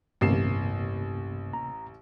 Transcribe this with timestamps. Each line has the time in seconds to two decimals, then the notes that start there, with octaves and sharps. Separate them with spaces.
0.21 A1 D2 G2 C3 A#3 C7 E7
1.53 A#5